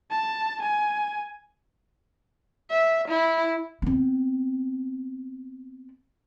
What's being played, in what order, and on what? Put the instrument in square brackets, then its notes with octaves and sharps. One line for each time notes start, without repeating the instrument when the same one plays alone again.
[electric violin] A5
G#5
[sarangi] E5
E4
[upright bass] B3 C4